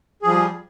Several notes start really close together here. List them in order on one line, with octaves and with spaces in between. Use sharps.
G#4 F3 G3